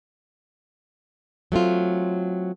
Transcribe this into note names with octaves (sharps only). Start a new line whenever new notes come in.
F#3 A3 C4 F4